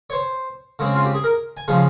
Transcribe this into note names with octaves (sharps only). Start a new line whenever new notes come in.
C#5
C5
C#3 G#3 C4
F4
G4
G#4
A#4
G#5
C#3 F3 G#3 F5